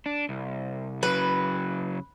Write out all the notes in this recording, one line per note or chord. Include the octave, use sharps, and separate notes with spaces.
D4
C2
C#3 F#3 B4